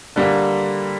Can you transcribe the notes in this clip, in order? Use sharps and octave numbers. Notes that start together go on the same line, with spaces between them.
D3 G3 A#3